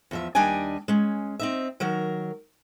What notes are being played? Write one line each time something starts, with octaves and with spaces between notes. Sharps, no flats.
E2 F3 E5
D#2 G3 D4 D#5 G5 G#5
G#3 C#4
C4 D#4 E5
D#3 F#3 A#4